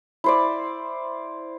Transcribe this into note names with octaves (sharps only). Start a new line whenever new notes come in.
E4 C5 D5